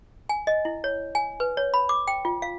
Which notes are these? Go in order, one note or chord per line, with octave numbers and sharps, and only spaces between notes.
G#5
D#5
E4
C#5
G#5
B4
C#5
B5
D6
G5
F4
F5